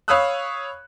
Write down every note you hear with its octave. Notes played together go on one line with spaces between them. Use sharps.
C#5 F5 B5 D#6 E6 F#6